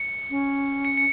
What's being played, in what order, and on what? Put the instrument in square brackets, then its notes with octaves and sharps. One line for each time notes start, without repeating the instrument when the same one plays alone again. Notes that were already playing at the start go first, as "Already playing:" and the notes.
Already playing: [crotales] C#7
[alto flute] C#4
[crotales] C#7
C#7